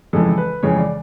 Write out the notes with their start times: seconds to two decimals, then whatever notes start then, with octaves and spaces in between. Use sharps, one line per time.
0.13 F2 C#3 E3 G#3 A4
0.37 B4
0.63 F2 C#3 E3 G#3 C#5
0.78 D5